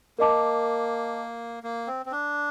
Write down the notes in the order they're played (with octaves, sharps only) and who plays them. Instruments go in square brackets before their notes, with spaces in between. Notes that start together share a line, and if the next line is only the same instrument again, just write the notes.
[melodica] A#3 [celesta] A#4 D#5 A5 D6
[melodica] A#3
C4
C4
D4